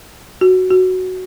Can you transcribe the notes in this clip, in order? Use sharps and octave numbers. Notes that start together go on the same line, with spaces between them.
F#4
F#4